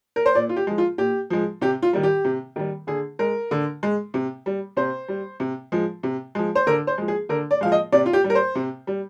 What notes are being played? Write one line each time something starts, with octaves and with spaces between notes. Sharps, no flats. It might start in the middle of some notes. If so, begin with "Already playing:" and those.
A#4
C5
A#2 D5
F4
G4
F3 G#3
F4
A#2 G4
F3 G#3
C3 G4
F4
D#3 G3
G4
C3
D#3 G3
D3 G#4
G#3 A#4
D3
G#3
C3
G3
C3 C5
G3
C3
F3 G#3
C3
F3 G#3
C5
D3 A#4
C5
F3 G#3
G#4
D3 A#4
D5
F3 G#3 F5
D#5
C3 D5
F4
G4
G3
A#4
C5
C3
G3